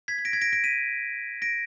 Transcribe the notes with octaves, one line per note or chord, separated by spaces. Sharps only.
G#6 B6
B6
A#6 D7
G#6 B6
A#6 D7
A#6 D7
B6 D#7
A#6 D7